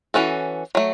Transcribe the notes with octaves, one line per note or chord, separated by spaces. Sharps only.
E3 G#3 C#4 F#4 A4
F#3 A3